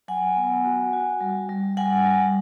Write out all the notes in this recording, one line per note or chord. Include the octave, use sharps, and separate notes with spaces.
F#3 F#5 G#5
B3
F#4
F#4
G3
G3
G3 F#5 G#5
G3